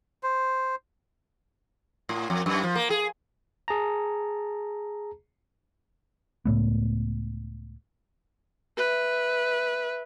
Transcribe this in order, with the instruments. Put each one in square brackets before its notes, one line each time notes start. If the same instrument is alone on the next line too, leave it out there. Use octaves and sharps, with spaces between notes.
[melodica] C5
[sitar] A2
F2
F#2
F3
A#3
G#4
[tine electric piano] G#4 A5 A#5
[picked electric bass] C#2 A2 A3 B3
[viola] B4 E5